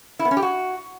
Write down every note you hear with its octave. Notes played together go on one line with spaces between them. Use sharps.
E4
B3
C#4
G4
F#4